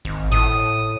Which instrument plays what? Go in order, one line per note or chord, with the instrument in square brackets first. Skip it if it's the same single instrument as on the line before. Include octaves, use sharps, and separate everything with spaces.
[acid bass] G#1
[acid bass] A2 [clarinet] D#6